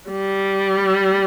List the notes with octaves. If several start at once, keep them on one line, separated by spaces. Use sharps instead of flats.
G3